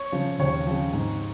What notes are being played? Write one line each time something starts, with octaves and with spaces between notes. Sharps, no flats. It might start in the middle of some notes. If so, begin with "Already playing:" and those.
Already playing: C#5
C#3 F3
D#2 C#5
C#3 F3
G#2